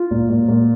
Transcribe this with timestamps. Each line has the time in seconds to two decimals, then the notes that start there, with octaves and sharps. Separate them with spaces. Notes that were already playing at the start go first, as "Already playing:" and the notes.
Already playing: F4
0.11 A#2
0.29 A#2
0.48 A#2